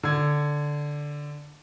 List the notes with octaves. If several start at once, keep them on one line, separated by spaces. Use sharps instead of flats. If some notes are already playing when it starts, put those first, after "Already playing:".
D3 G#6